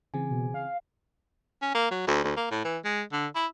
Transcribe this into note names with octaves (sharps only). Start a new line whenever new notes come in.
C#3 E3 C4 G#4 G#5
B2
F5
C#4
A#3
F#3
D2
D2
A#3
A2
E3
G#3
D3
E4